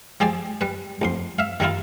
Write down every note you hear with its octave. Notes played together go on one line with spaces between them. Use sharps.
F3 G4 G#4 C5 D5
G3 B4
A1 F2 C6
E5 F5
D#3 G3 A#3 E4 F4